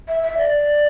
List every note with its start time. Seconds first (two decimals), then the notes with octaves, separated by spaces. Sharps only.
0.08 E5
0.23 E5
0.38 D5